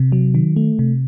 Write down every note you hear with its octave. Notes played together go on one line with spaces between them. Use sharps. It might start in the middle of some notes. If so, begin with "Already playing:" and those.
Already playing: C3
F#3
D#3
A3
C3